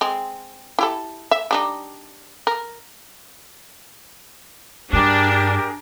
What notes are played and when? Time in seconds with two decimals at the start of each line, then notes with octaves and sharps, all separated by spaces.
0.01 G#3 C4
0.79 E4 G4 A4
1.31 E5
1.51 G3 D4 D#4
2.47 A#4
4.93 G2 D4 G4 G#4 A#4